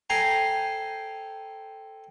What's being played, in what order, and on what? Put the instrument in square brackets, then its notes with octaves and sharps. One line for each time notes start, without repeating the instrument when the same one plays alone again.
[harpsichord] A4 C5 G5 G#5 A#5 C6